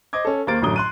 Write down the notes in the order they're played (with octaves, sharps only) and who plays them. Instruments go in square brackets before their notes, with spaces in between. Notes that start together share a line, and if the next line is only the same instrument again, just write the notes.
[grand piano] C5 D#5 D6 G#6
C#4 A4
D#2 A#3 G4 C5 A6 D7
A1 F#2 D3 F#3 D#6 G7
C6 F#6 D#7